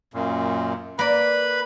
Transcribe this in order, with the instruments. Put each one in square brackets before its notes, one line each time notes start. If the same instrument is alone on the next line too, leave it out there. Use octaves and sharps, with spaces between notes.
[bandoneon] F#2 A#2
[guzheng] A#3 D5 [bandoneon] B4 B5